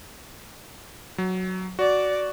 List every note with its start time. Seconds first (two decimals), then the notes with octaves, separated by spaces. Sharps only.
1.18 F#3
1.79 F#4 D5